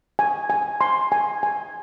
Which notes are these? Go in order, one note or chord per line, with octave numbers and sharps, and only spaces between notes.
G#5
G#5
C6
G#5
G#5